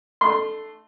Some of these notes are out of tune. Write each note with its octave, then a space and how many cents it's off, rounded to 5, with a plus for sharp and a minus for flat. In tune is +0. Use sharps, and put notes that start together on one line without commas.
A3 +0 D#4 -45 C6 -5